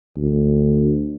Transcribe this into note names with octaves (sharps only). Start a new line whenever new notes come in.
D2